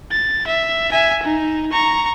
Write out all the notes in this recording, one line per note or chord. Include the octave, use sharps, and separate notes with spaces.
A6
E5
E5 G#5
D#4
A#5 C#6